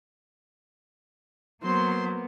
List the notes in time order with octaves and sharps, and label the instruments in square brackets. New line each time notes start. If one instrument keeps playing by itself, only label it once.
[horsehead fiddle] F#3 [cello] A#3 B3 [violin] C5 [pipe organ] C6